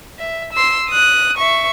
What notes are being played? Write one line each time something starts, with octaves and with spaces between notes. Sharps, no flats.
E5
C6 E6
D#6 F#6
E5 C#6